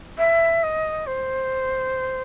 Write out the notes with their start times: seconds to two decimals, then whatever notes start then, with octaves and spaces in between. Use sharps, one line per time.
0.18 E5
0.63 D#5
1.07 C5